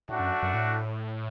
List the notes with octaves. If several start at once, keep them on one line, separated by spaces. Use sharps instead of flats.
A2 A3 D4 F#4
F#2
F#2
A2